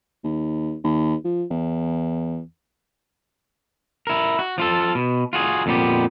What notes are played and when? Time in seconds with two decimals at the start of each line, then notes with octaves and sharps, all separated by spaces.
0.24 D#2
0.84 D#2
1.25 F3
1.51 E2
4.07 E4 A#4
4.39 F#4
4.58 F3 F4 A4
4.95 B2
5.33 F4 F#4 G#4
5.66 F2 A#2 B3 G4